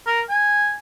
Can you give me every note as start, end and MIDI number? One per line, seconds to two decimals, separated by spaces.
0.06 0.21 70
0.29 0.75 80